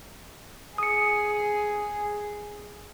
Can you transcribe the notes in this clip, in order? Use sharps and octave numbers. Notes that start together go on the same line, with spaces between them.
G#4 D#6 C#7